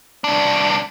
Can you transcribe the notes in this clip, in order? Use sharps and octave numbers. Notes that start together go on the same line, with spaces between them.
C2 D4